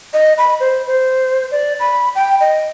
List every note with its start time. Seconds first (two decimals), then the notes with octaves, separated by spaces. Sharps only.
0.14 D#5
0.38 B5
0.60 C5
0.87 C5
1.51 D5
1.80 B5
2.15 G5
2.41 D#5